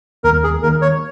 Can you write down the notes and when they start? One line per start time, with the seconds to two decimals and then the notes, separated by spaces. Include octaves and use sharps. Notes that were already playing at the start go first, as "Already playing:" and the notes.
0.24 D#2 A#4
0.44 G#4
0.63 D#3 A#3 A#4
0.82 C#5